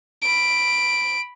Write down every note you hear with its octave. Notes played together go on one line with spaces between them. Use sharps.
B5 D7